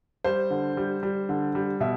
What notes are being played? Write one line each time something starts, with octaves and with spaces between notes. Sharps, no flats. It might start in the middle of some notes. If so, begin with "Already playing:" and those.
G3 C5
D3
G3
G3
D3
G3
B2 E5